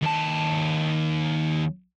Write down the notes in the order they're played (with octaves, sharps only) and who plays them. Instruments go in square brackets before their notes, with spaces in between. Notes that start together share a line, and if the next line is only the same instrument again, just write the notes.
[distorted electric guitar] D#2 A5